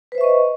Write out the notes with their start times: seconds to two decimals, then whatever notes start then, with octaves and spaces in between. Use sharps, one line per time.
0.12 B4
0.15 C5
0.18 E5
0.21 C#6
0.24 D#5